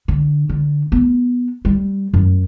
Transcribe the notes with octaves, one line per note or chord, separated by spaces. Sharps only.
D3
D3
B3
G3
F#2